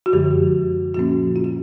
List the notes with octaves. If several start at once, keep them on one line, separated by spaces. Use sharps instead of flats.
F#4
F#2 D3 F3 G#3 G4
A#2 F3 A#3 C#4 F#4
F4
F#4